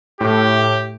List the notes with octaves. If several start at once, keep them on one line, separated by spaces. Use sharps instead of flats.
A2 G4